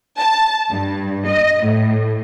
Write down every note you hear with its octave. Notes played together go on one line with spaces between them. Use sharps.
A5
G2
D#5
A2